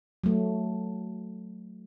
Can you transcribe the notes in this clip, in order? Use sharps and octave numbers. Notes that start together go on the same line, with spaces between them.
F#3 A3